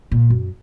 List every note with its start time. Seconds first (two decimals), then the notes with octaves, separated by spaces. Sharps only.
0.12 A#2
0.30 F#2